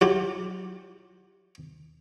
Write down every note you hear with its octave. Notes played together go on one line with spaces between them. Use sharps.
F#3 E4 F4 G4